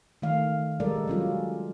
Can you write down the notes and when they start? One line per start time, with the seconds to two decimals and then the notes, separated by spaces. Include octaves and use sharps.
0.22 D#3 A3 F5
0.80 G3 G#3 A4 A#4 D5
1.08 F#3 C#4 F4